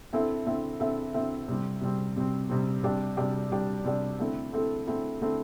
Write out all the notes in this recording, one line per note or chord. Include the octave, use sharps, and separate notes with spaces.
D3 C4 E4 A4 E5
D3 C4 E4 A4 E5
D3 C4 E4 A4 E5
D3 C4 E4 A4 E5
C3 G3 C4
C3 G3 C4
C3 G3 C4
C3 G3 C4
C3 G3 D4 G4 D5
C3 G3 D4 G4 D5
C3 G3 D4 G4 D5
C3 G3 D4 G4 D5
D3 A3 C4 E4 A4
D3 A3 C4 E4 A4
D3 A3 C4 E4 A4
D3 A3 C4 E4 A4